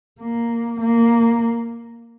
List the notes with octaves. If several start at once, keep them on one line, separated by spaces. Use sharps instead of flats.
A#3
A#3